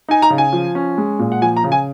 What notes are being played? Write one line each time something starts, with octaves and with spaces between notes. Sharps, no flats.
D#4 G#5
A#5
C#3
G#5
F3
C#4
G#3
A#2
F#5
F3 G#5
A#5
C#3
G#5